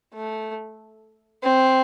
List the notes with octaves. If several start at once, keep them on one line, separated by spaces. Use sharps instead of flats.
A3
C4